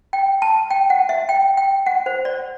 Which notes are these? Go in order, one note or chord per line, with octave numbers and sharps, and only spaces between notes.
G5
A5
G5
F#5
E5
G5
G5
F#5
C5
D5